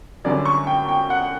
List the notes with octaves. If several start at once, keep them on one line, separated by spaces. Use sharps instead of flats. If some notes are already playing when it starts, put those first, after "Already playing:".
F#2 D3 G3 C#4 D5
C#6
G5
G5
F#5